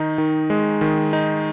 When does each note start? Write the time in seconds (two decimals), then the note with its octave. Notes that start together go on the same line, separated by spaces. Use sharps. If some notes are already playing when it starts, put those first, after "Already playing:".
Already playing: D#3 D#4
0.18 D#3
0.50 G#3
0.81 D#3
1.13 D#4